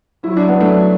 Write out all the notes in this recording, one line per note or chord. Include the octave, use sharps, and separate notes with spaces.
F#3 E4
D4
B3
A3 D4